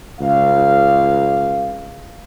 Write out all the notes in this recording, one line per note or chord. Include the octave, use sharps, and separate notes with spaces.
C#2 F5